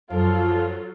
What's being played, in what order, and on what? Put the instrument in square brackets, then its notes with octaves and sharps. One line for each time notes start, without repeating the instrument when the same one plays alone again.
[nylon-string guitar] F#2 [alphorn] F3 [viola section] F#3 F4 A4 [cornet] F5